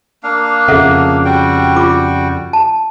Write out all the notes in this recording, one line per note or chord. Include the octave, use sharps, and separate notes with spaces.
A#3 D4 F5
F2 C#3 A4 E5 F#5
G3 F#4 G5
F4 D6
A5